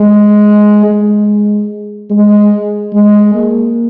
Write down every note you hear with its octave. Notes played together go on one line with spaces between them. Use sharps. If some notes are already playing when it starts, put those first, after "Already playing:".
Already playing: G#3
G#3
G#3
G#3
A#3